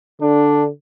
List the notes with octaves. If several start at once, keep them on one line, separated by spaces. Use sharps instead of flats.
D3 D4